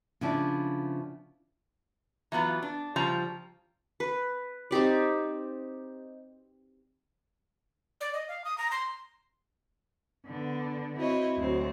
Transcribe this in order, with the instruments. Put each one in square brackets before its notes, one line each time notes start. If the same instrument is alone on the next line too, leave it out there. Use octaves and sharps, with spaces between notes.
[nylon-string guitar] C#3 F3 B3 D4 E4
[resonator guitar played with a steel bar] E3 F#3 B3 F4
D4
C#3 F3 G3 A#5
[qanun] B4
C4 D#4 G4 D5
[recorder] D5
D#5
F5
D#6
A#5
C6
[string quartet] D3 B3
C4 E4 F#4 C#5 D#5
D2 F#3 C4